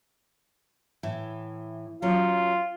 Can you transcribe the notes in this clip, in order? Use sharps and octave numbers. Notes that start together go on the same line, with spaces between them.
A2 E3
F#3 C#4 F4